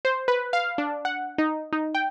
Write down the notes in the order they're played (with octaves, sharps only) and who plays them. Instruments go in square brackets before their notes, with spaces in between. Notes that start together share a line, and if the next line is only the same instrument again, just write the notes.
[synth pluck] C5
B4
F5
D4
F#5
D#4
D#4
G5